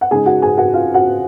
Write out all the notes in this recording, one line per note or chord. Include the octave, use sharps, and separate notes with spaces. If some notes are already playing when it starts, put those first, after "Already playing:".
F#5
C#3 G#3 D#4 G#4 G#5
F#4 F#5
G#4 G#5
F#4 F#5
F4 F5
F#4 F#5